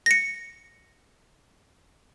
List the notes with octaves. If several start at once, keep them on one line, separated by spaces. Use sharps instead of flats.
A#6 C#7